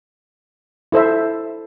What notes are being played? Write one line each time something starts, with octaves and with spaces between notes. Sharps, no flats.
E4 A4 C5 E5